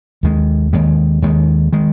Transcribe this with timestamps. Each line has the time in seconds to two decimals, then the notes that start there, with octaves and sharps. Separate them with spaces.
0.23 D#2 D#3 G#3
0.73 D#2 D#3 G#3
1.22 D#2 D#3 G#3
1.73 D#3 G#3